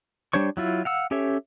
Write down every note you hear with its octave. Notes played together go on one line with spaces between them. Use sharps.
G3 D4 C5 C#5 C#6
F#3 E4 F4
F5 F#5 E6
C#4 G4 A4 C#5 E5